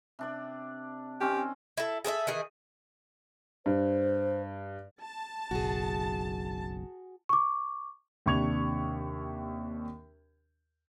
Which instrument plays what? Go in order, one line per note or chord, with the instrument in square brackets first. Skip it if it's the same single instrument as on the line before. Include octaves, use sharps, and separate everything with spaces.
[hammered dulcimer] C3 D4 D5
[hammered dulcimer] D#3 C4 C#4 [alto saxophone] G4
[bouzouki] E4 A4
G#4 A4 C5 E5
D#3 E3 G#4
[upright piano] G2 [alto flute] C5
[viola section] A5
[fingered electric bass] F#1 B1 [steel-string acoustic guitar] F#4 G#4
[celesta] C#6 D6
[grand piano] D#2 C3 D4 C#6 G#6 F7